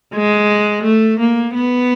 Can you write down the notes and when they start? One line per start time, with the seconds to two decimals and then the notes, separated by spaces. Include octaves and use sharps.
0.14 G#3
0.83 A3
1.19 A#3
1.54 B3